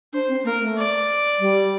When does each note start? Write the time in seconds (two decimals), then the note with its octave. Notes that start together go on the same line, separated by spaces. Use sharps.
0.13 D4 C5
0.29 C4
0.44 A#3 A#4
0.60 A3
0.76 D5
1.39 G3